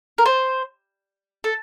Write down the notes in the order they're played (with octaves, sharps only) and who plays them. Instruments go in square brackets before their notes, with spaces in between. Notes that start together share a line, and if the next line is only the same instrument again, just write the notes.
[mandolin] A#4
C5
A4